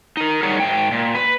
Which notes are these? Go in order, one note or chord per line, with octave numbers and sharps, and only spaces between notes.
D#4 A#4
G3 D#4 G#4 A#4 C#5 F#5
G#2 G5
A#2
B4